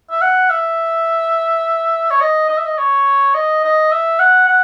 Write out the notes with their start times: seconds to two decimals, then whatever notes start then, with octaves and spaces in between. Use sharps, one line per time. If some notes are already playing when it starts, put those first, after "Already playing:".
0.10 E5
0.22 F#5
0.50 E5
2.11 C#5
2.21 D#5
2.49 D#5
2.58 E5
2.66 D#5
2.78 C#5
3.34 D#5
3.64 D#5
3.92 E5
4.19 F#5
4.48 F#5